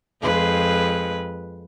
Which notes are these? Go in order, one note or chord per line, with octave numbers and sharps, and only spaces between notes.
F2 G#3 B4